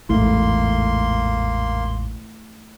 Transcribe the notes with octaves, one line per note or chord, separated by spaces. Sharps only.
A1 E2 G#2 A3 A#3 E4 C6